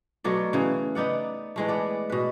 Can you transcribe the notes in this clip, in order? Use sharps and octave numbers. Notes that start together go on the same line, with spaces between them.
B2 F#3 A3 D5
C#3 E3
B3 D#4 D5 F#5
E3 G#3 A3
B3 D5
B2 B4